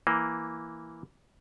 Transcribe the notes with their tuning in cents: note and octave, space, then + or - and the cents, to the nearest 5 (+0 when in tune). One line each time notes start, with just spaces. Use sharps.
E3 +0 A#3 +0